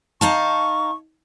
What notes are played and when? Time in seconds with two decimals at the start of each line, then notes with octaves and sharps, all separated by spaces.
0.21 D#4 F5 A5 C#6